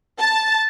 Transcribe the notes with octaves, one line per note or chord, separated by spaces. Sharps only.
A5